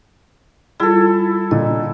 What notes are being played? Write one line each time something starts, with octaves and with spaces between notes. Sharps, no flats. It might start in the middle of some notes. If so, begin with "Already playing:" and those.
G3 E4 F4 G#4 A4
A#2 D3 D#5